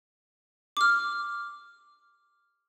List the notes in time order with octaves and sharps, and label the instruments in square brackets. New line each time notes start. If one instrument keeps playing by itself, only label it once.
[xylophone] D6 F6